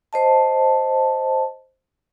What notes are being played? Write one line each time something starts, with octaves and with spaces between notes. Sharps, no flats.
C5 D#5 A5